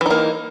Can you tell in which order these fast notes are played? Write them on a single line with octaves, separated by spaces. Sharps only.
E3 D#4 A#3